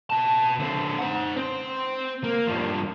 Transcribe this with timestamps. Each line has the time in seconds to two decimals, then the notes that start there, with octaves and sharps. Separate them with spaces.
0.10 B2 A5
0.59 D3 C4
0.99 C5 F#5
1.36 C4 C5
2.24 A#3
2.47 G2 F3